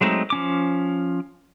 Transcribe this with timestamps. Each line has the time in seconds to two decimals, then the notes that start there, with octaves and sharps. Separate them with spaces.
0.01 F#3 G#3 A3 C4 D#4
0.30 F3 C#4 D6